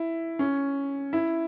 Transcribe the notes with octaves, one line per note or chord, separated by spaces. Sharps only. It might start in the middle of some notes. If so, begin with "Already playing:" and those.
Already playing: E4
C#4
E4